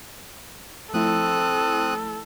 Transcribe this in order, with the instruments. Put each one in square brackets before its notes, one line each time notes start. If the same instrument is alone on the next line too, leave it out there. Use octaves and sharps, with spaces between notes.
[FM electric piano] F3 A3 E4 [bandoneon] C4 D#6 F#6 [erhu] A4